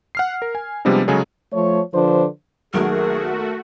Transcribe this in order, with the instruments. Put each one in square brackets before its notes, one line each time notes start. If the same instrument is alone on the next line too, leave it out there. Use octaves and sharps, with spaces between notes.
[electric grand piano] F#5 F6 C7
A#4
G#5
C3 F3 G3 G#3 B3 D4
C#3 F#3 G#3 G#4 A4 C#5
[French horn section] F3 A3 C#5
D3 F3 D4 B4 C5
[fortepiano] B1 D#3 A#3 [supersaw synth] A3 F#4 [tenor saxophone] G#4 [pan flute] A#4